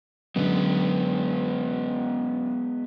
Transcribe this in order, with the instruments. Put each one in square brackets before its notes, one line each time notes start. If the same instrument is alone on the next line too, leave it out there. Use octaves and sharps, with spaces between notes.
[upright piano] F#2 D3 [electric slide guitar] G#3 B3